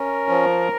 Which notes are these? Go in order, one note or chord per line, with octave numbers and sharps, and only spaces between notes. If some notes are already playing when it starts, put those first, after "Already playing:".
Already playing: C#4 A#4
F3